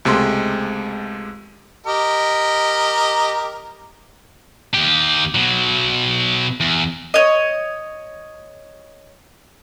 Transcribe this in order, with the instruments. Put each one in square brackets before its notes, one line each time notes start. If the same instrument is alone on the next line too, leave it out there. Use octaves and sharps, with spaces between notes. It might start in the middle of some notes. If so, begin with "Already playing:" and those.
[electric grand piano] C#2 C3 G#3 A3 C6
[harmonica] G4 A#4 D#5
[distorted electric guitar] D#2 G4
B2 F#3
E2
[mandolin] C#5 D#5